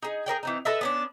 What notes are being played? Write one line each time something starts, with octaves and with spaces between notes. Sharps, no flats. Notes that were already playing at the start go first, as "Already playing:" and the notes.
D#4 G#4
G#4 A#4 D5 G5
E3 C4 D#4
A4 B4 D#5 E5
B3 C#4 D4